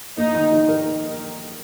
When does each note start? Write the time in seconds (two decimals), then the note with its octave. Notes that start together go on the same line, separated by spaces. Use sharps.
0.18 A#3 D#4
0.35 D#3
0.53 D#4
0.69 A#4